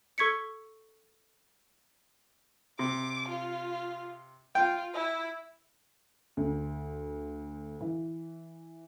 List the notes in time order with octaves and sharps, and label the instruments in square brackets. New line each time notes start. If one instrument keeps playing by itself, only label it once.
[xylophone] A4 C#6 G#6 B6 C#7
[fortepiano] C3 [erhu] D6
[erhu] F4
[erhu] F4 [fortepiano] G5
[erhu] E4
[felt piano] D2
E3